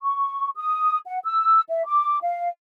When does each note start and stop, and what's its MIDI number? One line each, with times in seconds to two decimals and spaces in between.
0.02 0.50 85
0.57 0.98 87
1.06 1.19 78
1.25 1.61 88
1.69 1.85 76
1.87 2.18 86
2.22 2.48 77